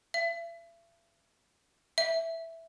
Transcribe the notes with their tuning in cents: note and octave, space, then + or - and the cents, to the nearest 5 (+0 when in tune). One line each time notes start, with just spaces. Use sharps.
E5 +40
E5 +0